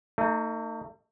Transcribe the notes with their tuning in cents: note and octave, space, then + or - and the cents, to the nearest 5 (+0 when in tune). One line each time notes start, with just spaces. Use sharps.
A3 +40 D#4 +0